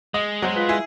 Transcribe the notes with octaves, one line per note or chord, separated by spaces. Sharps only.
G#3 D#5
F#3 C5
F4 B4
E4 G#4